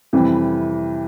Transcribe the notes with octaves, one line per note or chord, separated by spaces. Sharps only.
F2 C3 E3 G3